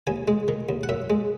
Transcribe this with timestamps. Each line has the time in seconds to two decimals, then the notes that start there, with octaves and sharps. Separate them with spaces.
0.07 D#2 G#5
0.28 G#3
0.48 D#3
0.69 D#2
0.83 F#5
0.89 F#2 E5
1.10 G#3